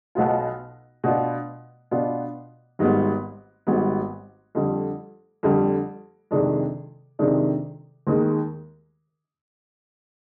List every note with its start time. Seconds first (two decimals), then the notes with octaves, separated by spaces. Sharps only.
0.15 B1 B2 B3 F4
1.04 B2 B3 D4 F4
1.91 B2 B3 D4 F4
2.79 G#1 G#2 G3 B3
3.67 G#1 G#2 G3 B3
4.55 F2 D3 G3
5.43 F2 D3 G3
6.31 F2 C3 D#3 G#3 D4
7.19 F2 C3 D#3 G#3 D4
8.07 D#2 D#3 G#3